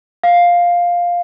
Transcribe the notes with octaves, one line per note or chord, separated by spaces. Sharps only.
F5